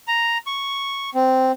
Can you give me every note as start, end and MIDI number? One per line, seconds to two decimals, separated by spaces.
0.08 0.38 82
0.47 1.10 85
1.15 1.52 60